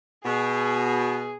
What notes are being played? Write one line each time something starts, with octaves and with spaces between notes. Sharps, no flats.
B2 G#4